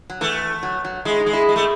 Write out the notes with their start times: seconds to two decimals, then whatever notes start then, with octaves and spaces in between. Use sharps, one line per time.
0.10 F#3
0.21 E3 A3
0.63 F#3
0.85 F#3
1.05 G#3 E4
1.20 D#4
1.26 G#3
1.33 E4
1.49 G#3
1.56 A3